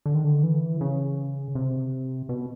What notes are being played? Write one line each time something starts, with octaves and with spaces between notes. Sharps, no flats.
D3
D#3
D3
E3
C#3
C3
B2